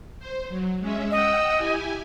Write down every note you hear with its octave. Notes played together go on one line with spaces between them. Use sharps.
C5
F#3
G#3 C#4 E5
D#5 F#5 G5 E6
E4 G4 G#5